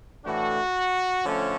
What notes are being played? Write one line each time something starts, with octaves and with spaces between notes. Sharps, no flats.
A2 E3 A3 D4 F#4
D3 F3 A3 C#4